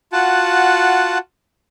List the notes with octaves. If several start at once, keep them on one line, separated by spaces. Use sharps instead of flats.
F4 F#4 F#5 A5